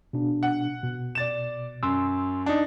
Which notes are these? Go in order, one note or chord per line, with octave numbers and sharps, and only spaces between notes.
B2 D4
F#5
B2
D5 A6 E7
F#2 C6 E6
D4 D#4